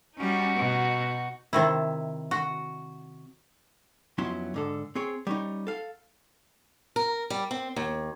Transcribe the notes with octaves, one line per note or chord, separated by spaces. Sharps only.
G3 C#4 D#4 F#4
B2
C3 D#3 E4
F#4
F2 F#3 B3 C#4 E4 C6
G#2 D3 A4
C4 G#4 C#5
G3 C#4 D#4
A4 F5
A#4
G3
C4
D#2